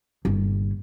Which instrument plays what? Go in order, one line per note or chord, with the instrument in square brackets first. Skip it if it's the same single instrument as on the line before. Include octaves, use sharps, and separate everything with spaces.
[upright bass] G1 A#2